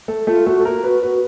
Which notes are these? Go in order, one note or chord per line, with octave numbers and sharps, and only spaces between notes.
A3 A4
A3 F4 A4
A3 F#4 A4
A4
A#3 A#4
B3 F#4 B4
B3 F#4 B4